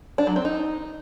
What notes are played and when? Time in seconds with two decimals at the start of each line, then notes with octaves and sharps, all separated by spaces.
0.18 D4
0.27 F#3
0.36 C4
0.45 D#4